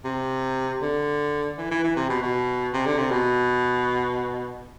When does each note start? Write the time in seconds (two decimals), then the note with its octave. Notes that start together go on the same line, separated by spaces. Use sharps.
0.05 C3
0.82 D3
1.58 E3
1.71 E3
1.83 E3
1.96 C3
2.10 B2
2.22 B2
2.73 C3
2.86 D3
2.98 C3
3.11 B2